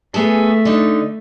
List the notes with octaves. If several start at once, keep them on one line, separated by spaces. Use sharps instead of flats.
A3 B3 G#4 A4
D3 D#4